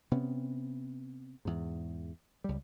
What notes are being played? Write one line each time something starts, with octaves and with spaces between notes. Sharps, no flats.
C3 B3 C#4
E2 G#2
C#2 G3